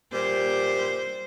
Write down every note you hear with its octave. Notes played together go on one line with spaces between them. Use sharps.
A#2 G3 C5